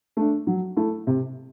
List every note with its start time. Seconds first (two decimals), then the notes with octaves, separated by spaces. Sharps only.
0.17 A3 D4
0.47 F#3
0.77 A3 E4
1.07 C3